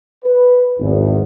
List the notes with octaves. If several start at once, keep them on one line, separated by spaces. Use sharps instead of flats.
B4
G#1 E2